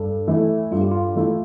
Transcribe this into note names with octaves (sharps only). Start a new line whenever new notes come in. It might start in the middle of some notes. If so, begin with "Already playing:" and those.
Already playing: G2 A4
E3 A3 E4
G2 F4
G4
F4
E3 A3 E4